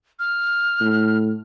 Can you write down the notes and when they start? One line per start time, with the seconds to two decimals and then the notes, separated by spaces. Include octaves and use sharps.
0.19 F6
0.81 A2